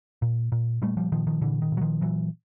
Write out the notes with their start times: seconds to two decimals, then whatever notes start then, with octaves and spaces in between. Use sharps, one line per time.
0.22 A#2
0.52 A#2
0.82 A#2 G3 A3
0.97 F3 G3
1.12 A#2 D#3 F3
1.27 D#3 F3
1.41 A#2 D3 E3
1.62 D#3
1.72 A#2
1.77 F#3
1.81 D#3 F3
2.01 A#2 E3 F#3